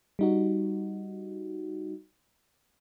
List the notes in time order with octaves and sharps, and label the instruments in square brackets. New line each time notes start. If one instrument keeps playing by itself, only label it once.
[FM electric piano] G3 D#4 F#4